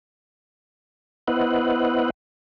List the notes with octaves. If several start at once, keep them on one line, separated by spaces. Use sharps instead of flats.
B3 E4 B4 C5 D#5 F#5